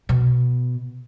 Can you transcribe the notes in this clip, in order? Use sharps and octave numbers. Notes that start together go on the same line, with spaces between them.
B2